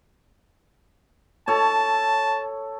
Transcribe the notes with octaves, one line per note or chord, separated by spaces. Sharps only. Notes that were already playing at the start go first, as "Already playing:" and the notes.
A4 C#5 A5